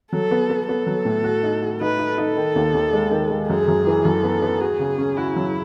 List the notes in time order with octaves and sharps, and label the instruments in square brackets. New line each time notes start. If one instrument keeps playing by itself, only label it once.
[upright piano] F#3 [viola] A4
[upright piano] B3
B3
[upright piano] B3 [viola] A4
[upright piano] F#3
A2
F#4
D#4
F#4
[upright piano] D#4 [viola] B4
[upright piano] D#4
[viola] A4
[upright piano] D#4
D#3
D#2
D#2
G#3
D#3
G#3
[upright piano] F#2 [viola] G#4
[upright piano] F#2
E3
[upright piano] F#2 [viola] A4
[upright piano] B3
B3
[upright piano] F#4 [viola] G#4
[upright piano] C#3
C#4
[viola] E4 [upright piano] F#4
[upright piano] F#3